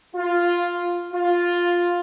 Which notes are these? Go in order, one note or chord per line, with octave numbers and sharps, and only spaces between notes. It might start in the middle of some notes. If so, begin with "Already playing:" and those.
F4
F4